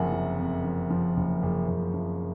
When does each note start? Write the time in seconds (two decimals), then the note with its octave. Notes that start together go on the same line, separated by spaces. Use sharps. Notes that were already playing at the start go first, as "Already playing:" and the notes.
Already playing: F#1 F2 C3 F3 A#4 E5 F#5 G#5
0.12 F3
0.38 F2
0.64 F3
0.90 F3
1.17 F#1
1.43 F#1
1.68 F#1
1.94 F3